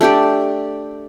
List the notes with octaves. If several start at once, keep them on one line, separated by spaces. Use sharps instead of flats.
A3 D4 G4 D5